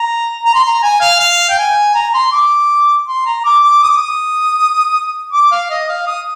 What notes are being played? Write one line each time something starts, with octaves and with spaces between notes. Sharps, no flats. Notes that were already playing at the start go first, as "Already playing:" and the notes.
Already playing: A#5
A#5
C6
A#5
G#5
F5
F5
G5
G#5
A#5
C6
D6
C6
A#5
D6
D6
D#6
D6
D#6
D6
F5
D#5
F5
D#6